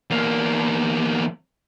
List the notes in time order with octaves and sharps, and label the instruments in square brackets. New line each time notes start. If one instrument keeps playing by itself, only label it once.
[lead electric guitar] E2 A#3